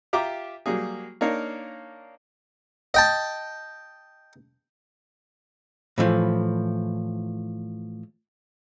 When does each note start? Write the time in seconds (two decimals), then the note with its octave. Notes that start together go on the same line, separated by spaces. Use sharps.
0.13 F4 G4 E5 G5 A#5 D6
0.66 F#3 G3 A#3 G#4
1.21 A#3 D4 D#4 A#4 C#5 F5
2.94 D#5 G5 A5
5.98 A2 E3 F3